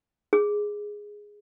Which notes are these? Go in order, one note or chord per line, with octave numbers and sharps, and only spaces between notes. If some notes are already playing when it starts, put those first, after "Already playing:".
G#4